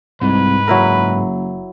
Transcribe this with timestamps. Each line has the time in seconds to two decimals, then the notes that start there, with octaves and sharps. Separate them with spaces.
0.21 C2 G#2 B4
0.68 F#1 F#3 E4 A#4